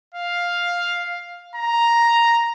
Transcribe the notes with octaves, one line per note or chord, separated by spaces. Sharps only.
F5
A#5